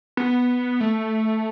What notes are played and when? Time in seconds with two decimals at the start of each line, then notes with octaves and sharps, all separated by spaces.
0.17 B3
0.81 A3